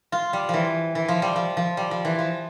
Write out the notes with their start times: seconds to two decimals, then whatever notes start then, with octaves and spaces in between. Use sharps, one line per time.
0.12 F4
0.33 G3
0.49 E3 F3
0.95 E3
1.08 F3
1.22 G3
1.36 F3
1.57 F3
1.77 G3
1.91 F3
2.05 E3
2.19 F3